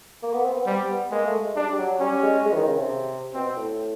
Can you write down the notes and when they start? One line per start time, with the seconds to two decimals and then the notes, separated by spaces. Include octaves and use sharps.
0.23 A#3
0.33 B3
0.44 C4
0.56 B3
0.66 G3 C4
0.90 B3
1.11 G#3 A#3
1.26 A3
1.41 G#3
1.56 G3 D4
1.72 G3
1.79 F#3
2.00 G3 C#4
2.23 G#3
2.45 G#3
2.52 E3
2.56 D#3
2.67 C#3
2.79 C3
3.34 B2 C4
3.56 A2